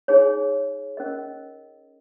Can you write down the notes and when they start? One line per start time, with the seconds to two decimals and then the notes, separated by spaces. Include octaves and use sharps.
0.08 D#4 G#4 C#5 G#5
0.97 C#4 A#4 D#5